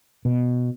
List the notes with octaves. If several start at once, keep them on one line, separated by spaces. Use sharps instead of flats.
B2